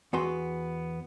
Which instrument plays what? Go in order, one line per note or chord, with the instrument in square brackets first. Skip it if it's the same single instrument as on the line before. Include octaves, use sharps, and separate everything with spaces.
[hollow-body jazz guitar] E2 B3 F#4 C6